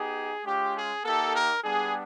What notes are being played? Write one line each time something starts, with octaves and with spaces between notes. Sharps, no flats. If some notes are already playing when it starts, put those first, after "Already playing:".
Already playing: B3 D#4 G4 G#4
G#3 C#4 F4 G4
G#4
A#3 D#4 G4 A4
A#4
G3 B3 D4 G#4